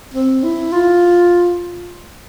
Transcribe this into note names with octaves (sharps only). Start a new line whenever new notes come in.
C4
E4
F4